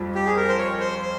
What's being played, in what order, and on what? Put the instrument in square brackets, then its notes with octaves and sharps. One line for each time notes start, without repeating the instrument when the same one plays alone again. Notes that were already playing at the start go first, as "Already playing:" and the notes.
Already playing: [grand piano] F2 G3
[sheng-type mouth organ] G4
G#4
A#4
C5
C#5
C5
C5